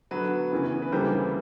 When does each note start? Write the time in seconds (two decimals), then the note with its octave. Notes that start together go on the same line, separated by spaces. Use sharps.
0.11 D3 F#3 B3 B4
0.52 E2 C#3 E3
0.82 B4
0.92 D2 C#3 E3 G3 A#3 C5